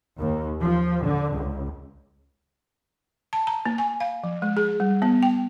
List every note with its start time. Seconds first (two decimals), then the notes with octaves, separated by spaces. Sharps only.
0.19 D#2
0.60 F3
1.02 D3
1.32 C#2
3.33 A5
3.47 A#5
3.66 A#3
3.78 G#5
4.00 F5
4.24 F3
4.42 G#3
4.57 G#4
4.80 G3
5.02 B3
5.23 G5